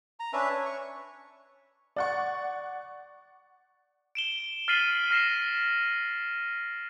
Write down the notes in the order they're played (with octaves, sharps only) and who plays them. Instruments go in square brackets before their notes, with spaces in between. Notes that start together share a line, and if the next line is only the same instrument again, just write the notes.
[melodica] A#5
C#4 D4 B4 E5
C#5
C#6
[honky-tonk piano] D5 F#5 C#6
[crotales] D7 E7 G7
F6 A6 B6 C7 D#7 F#7
F6 A#6 C7 E7